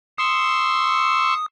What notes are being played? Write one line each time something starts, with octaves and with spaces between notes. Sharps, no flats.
C6 C#6 D#6 E6